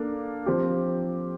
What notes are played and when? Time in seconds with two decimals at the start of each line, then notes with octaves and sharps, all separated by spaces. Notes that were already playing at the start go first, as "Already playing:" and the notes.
Already playing: A#3 D4 A4
0.46 F3 C4 G4